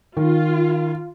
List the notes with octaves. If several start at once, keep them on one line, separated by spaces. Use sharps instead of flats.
D#3 F4